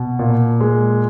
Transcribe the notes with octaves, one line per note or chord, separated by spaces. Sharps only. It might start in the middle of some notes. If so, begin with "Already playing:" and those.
Already playing: B2
A#2
G#3